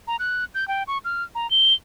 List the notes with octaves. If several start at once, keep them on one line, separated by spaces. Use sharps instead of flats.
A#5
F#6
G6
G5
C#6
F6
A#5
G7